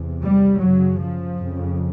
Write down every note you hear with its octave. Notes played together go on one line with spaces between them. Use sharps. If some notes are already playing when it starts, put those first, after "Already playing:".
Already playing: E2 C3
G3
F#2 C#3 F#3
F3
F2 C#3